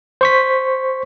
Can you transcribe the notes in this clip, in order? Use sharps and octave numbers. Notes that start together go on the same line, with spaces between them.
C5 C#6 B6